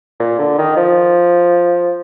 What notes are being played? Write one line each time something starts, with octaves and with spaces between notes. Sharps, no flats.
A#2
D3
D#3
F3